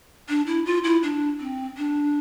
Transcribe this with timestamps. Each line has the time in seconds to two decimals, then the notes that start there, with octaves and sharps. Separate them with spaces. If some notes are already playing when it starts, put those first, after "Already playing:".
0.29 D4
0.47 E4
0.66 F4
0.84 E4
1.03 D4
1.40 C4
1.77 D4